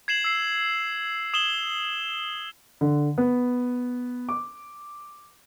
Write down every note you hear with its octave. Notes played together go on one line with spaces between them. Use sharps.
G#6 C7 E7 F#7
E6 C7
D#6 E7 F#7 G7
D3
B3
D6